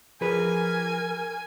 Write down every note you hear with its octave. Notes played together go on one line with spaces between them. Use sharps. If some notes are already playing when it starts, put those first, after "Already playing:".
F3 G#4 A#4 B4 G#5